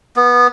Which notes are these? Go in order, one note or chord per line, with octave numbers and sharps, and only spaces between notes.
B3